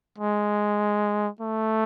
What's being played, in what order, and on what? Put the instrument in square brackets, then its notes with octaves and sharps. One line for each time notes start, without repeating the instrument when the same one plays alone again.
[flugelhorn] G#3
A3